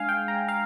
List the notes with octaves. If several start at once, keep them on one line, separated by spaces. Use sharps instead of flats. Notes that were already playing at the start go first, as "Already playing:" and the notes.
Already playing: G#3 D4 F5 G#5
G5
A#5
F5